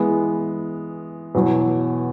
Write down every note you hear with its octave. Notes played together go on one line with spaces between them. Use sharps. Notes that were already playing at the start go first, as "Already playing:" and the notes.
Already playing: E3 G#3 B3
E2 B2 F#3